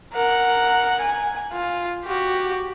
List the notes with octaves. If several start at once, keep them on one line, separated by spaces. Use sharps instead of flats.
A#4 F#5
G#5
F4
F#4 G4